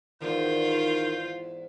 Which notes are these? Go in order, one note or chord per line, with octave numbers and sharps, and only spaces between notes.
E2 G#2 D#3 F4 G6